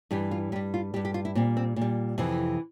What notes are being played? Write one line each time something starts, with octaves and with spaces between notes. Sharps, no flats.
G2 E3 G3 G4
F4
G2 G3 G4
F4
G2 G3 G4
G4
F4
E4
A#2 G3 C4
C4
A#2
G3
F2 C3 E3